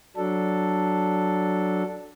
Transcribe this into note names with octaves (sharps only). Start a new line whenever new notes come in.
F#3 D4 A4